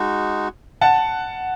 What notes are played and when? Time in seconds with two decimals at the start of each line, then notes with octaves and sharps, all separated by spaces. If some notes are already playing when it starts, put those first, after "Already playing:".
Already playing: G#3 D#4 F#4
0.81 F#5 A5